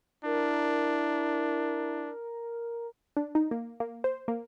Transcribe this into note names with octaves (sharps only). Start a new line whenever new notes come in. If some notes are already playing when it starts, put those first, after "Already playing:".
D4 E4 A#4
D4
D#4
A#3
A#3
C5
A#3